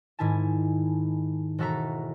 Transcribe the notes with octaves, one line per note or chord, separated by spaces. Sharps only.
G#2 D#3 E4 G#5 A5
E1 F#4 A4 E5 A#5